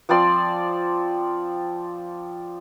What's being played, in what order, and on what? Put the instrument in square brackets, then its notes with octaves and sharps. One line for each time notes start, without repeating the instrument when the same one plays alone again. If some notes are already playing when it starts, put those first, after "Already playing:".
[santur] F3 C4 D5 C6